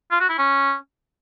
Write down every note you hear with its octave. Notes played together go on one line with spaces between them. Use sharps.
F4
F#4
E4
C#4